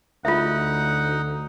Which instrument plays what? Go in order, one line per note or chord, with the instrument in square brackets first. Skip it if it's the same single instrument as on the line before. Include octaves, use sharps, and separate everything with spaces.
[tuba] D2 [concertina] D#4 [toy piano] F4 E5 [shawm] F#5